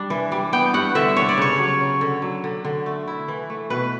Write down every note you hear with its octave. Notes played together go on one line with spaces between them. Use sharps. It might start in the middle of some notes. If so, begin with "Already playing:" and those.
Already playing: G3 D4
E3
G3
B3 G5
G2 F#5
D3 E5
D4 C#5
D5
C#3 C#5
F#3
C#4
D3
F#3
D3
D3
A3
E4
E3
A3
B2 B4